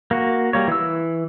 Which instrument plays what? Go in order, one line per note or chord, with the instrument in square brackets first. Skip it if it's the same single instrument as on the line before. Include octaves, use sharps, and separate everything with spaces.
[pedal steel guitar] A#3 F#4
G3 A#3 C#5
E3 E6